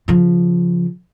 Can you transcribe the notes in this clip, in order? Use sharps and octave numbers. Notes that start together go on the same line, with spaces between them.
C#3 F3